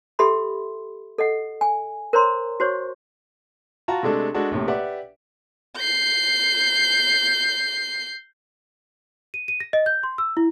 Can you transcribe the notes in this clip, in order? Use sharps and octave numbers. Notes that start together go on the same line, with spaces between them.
G4 A4 E5 B5 C6
A4 D#5 F#5
G#5
A#4 C5 C#5 A#5 C6
F#4 C5 C#5 C#6
F4 F#4 A5 A#5
C3 G#3 A3 D4 A4
G#3 D4 F#4 A4
A#1 A2 C3
G4 B4 D5 E5 F#5
G6 C7
D#7
D#7
A#6
D#5
G6
C6
E6
E4